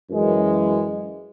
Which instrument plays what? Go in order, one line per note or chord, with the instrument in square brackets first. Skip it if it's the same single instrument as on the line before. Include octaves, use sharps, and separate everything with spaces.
[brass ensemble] F#2 E3 G#3